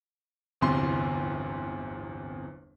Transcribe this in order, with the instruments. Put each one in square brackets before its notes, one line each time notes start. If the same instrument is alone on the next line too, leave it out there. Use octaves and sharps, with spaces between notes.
[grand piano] D1 G1 E2 C3 C6